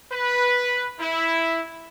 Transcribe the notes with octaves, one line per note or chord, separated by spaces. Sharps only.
B4
E4